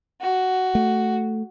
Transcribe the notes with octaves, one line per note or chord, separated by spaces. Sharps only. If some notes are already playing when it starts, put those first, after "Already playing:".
F#4
A3